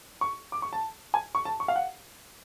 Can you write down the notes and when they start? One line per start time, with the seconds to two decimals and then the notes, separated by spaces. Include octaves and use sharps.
0.21 C#6
0.52 D6
0.62 C#6
0.73 A5
1.14 G#5
1.35 C#6
1.45 A5
1.60 C#6
1.68 F5
1.76 F#5